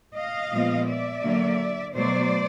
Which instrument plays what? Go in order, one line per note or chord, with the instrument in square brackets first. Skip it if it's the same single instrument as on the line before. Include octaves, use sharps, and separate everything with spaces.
[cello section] D#5 F5
A#2 F3 G#3 B3
D5 E5
D3 F#3 A#3
B2 F#3 A3 C5 D5